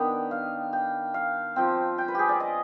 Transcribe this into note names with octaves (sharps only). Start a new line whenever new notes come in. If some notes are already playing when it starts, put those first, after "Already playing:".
Already playing: D#3 B3 D4 G5
F5
G5
F5
F3 C4 G5
G5
B4
G4 G#4
D5
D#5